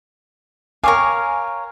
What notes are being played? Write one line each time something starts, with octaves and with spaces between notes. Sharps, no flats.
A#4 C#5 F5 G5 G#5 D6